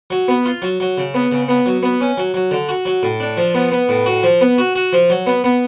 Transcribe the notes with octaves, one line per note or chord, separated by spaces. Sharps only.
F#3
B3
F4
F#3
F#3
C#3
B3
C#3
B3
F#3
B3
C#4
F#3
F#3
D3
F#4
F#3
A2
D4
F3
B3
B3
A2
F#4
F3
B3
F#4
F#4
F3
F#3
B3
B3